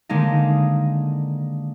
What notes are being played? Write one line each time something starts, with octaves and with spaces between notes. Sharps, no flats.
D3 D#3 G#3 A#3 D#4